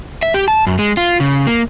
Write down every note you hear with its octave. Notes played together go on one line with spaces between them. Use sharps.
E5
G4
A5
F#2
G#3
F4
C#3
A#3